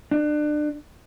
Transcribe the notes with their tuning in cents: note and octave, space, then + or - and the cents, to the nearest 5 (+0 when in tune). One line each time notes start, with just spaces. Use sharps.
D4 +30